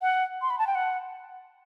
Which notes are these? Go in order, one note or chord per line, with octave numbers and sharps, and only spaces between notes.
F#5
C6
B5
A5
G5
F#5